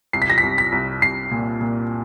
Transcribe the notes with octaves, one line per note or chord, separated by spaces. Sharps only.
C2 C7
B6
A#6
B6
C2
B6
C2
C2 C7
A#2
A#2